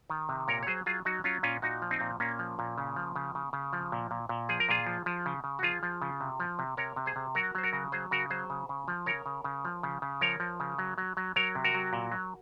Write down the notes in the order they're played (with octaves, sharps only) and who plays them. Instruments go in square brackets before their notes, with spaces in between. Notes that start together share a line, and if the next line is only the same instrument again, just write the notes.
[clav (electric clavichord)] D#3
C3
A#2 A#4 C#5
C#5
F#3 G#4 C5
F#3 F4 G#4
F#3 D#4 F#4
F#3 C#4 F4
A#2 C#4 F4
A#2 D#4 F#4
F3
C4 D#4
A#2
A#2 A#3 C#4
F3
A#2
C#3
F3
C#3
C#3
C#3
F3
A#2
A#2
A#2
F3 G#4
A#4
A#2 F4 G#4
F3
F3
C#3
C#3
F#4
F3 F4 G#4
F3
C#3
C3
F3
C3
C3 A#4 C#5
C3
G#4 C5
C3
F#3 F#4 A#4
F#3 C5
F#4 A#4
C#3
F#3 G#4 C5
C#3 F#4 A#4
F#3 G#4 C5
C#3
C#3
F3
C#3 A#4 C#5
C#3
C#3
F3
C#3
C#3
F3 A#4 C#5
F3
C#3
F#3
F#3
F#3
F#3 A#4 C#5
C3
F#4 A#4
F#3
A#2
F#3